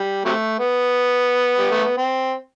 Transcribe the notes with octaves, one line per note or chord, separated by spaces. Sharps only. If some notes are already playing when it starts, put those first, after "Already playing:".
Already playing: G3
C3 F#3 A3
B3
G3
A3
B3
C4